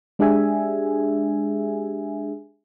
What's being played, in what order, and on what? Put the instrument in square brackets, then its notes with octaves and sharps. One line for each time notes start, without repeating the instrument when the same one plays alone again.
[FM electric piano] G#3 D4 G4 G#4 E5 G#5